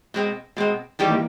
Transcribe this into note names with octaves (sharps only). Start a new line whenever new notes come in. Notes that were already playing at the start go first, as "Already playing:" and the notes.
B2 G#3 C4
B2 G#3 C4
D#3 E3 G3 C4 D#4 G4
A#3